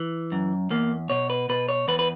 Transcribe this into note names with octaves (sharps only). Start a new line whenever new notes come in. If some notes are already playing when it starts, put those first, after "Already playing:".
Already playing: E3
F#2
E2 A#3
B2 C#5
B4
B2 B4
C#5
E2 B4
B4